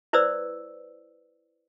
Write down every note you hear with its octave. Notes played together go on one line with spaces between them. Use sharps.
E4 B4 C5 D5 E6